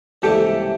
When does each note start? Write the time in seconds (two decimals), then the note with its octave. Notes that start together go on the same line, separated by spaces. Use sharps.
0.22 C#2 C3 E3 G3 A#3 G4 A4